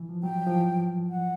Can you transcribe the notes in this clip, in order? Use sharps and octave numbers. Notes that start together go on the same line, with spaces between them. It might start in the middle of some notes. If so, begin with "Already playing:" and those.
Already playing: E3
F3
F#3 G5
F3
E3
F#5